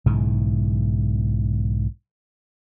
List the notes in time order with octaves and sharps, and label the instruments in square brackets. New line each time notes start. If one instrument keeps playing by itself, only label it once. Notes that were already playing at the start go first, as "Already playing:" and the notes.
[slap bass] B1 G#2 C#3 E3